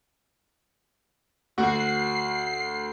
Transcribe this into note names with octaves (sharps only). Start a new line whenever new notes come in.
D2 F#4 C7